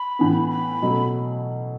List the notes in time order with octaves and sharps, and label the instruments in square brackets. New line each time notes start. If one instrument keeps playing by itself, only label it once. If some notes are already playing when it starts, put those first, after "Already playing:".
Already playing: [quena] B5
[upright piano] A2 E3 B3
[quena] B5
[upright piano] B2 F#3 A3